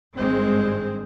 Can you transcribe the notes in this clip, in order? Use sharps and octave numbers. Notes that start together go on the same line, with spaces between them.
G#1 G2 G#3 C4